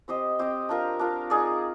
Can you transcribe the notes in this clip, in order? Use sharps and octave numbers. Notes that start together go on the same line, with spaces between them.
C4 G4 C5 D#5
C4 G4 C5 D#5
D4 F4 A#4
D4 F4 A#4
D#4 G#4 D5